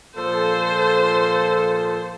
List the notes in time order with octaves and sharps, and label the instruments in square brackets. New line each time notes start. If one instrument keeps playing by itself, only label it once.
[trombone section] A#2 F3 A4 [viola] C5